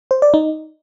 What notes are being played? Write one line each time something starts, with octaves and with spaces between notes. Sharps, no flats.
C5
D5
D#4